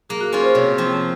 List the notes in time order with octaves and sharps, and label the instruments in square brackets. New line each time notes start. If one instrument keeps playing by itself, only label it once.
[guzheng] A#3 [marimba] G#4
[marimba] F#4
[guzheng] C#4 F4 [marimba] G#4
[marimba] C5
[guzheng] C3 [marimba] C#5
[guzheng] F3 C4